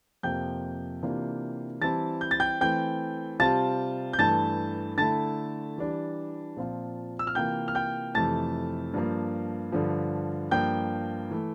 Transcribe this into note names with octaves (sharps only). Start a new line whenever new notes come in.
F2 C3 F3 A#3 G5 G6
C3 E3 A#3 D4 F4
E3 G3 C4 E4 A5 A6
G6
A6
G5 G6
E3 A3 C4 G5 G6
C3 G3 C4 F4 A5 A6
G6
G2 E3 A3 A5 A6
D3 A3 E4 A5 A6
E3 G3 D4
A#2 F3 C4 F4
E6
F6
C3 E3 A#3 F4 G5 G6
F6
G5 G6
F2 C3 E3 A3 A5 A6
G2 F3 A#3
G2 D3 F3
G2 F3 A#3 G5 G6
E3 A3